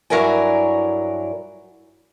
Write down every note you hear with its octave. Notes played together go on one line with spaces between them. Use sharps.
G2 F#3 E4 A#4 D5 G#5